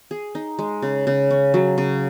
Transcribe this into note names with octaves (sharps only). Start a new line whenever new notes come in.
G#4
D#4
G#3
C#3
C#3
C#4
F#3
C#3